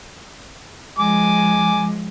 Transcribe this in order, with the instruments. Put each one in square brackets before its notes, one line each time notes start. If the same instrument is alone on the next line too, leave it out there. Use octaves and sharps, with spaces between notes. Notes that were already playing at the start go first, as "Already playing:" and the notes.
[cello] F3 G#3 [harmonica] G#5 D6